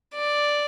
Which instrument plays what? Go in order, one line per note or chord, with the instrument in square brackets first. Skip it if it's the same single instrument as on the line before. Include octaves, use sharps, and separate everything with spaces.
[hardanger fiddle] D5